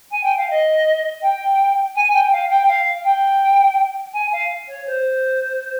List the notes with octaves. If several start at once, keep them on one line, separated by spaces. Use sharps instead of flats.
G#5
G5
F5
D#5
G5
G#5
G5
F5
G5
F5
G5
G#5
F5
C#5
C5